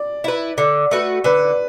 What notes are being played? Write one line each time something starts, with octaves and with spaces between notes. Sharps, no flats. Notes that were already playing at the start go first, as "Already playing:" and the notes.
Already playing: D5
E4 B4
D3
A3 F#4 B4
D3 B4